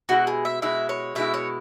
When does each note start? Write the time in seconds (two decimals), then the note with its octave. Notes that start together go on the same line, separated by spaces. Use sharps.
0.09 B2 G#3 E4 F#4
0.27 G#4
0.45 E5
0.62 B2 G#3 E4 E5
0.89 C#5
1.15 B2 G#3 E4 E5
1.34 C#5